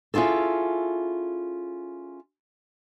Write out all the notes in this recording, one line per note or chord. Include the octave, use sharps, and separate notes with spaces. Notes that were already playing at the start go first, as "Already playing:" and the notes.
C#4 E4 F4 G#4 A4